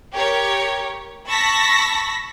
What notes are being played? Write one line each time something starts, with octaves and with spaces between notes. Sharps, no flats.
G4 A#4 C#5
A5 B5 C#6 E6 A#6 B6